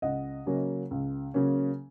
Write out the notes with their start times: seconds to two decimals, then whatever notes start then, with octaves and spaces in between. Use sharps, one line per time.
0.02 C#2 D#5 F#5
0.46 C#3 F#3 A#3 C#4
0.91 C#2
1.34 C#3 F#3 A#3 C#4